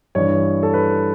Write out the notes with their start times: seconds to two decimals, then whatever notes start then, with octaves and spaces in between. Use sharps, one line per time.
0.15 G2 E3 C#5
0.63 A4
0.74 B4